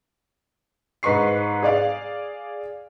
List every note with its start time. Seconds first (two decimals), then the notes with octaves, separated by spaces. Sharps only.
1.03 G#2 B4 D#5 C#6 C7
1.62 G#4 D5 F5